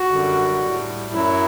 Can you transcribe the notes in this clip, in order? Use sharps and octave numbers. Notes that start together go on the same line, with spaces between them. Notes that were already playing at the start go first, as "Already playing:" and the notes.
Already playing: F#4
F#2 D3 G3
A2 G3
F#2 F#3 E4